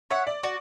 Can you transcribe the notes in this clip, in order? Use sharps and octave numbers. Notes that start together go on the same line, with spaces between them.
C#5 E5 F#5
D5
F#4 D5